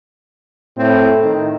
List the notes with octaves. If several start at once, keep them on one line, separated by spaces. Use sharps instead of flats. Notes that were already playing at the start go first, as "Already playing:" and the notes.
A2 C4
D#3